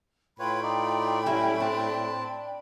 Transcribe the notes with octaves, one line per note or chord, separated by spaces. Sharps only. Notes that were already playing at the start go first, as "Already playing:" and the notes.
A2 F4 B4 C#5 G5 B5
D#4 F4 D5
F#3 G3 C#4 E4
C4 D4 A5